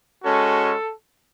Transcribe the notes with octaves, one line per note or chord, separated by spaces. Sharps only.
G#3 C#4 F#4 A4